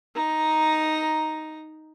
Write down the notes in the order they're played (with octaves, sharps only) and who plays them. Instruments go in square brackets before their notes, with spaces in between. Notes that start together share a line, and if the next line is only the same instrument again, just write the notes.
[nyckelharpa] D#4 A#5